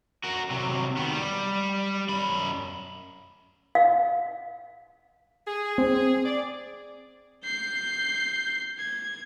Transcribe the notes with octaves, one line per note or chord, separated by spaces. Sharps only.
F#4 A#4
C3 F#3
D#3 B3
G3
F#2 B5
F5
G#4
C4
D5
G6 C7
G#6